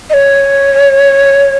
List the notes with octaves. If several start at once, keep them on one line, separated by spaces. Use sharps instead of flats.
D#5
C#5